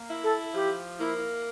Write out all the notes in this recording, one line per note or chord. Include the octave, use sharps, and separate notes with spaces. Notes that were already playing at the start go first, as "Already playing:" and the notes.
Already playing: A#3
E4
A4
F3 G4
A#3 E4